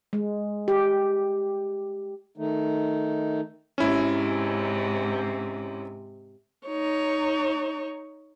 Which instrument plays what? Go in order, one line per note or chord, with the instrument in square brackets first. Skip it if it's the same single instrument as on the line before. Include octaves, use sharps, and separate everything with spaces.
[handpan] G#3
G4
[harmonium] D#3 A3 D#4
[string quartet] G#2 C3 [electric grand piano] C#4 E4
[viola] D#4 C#5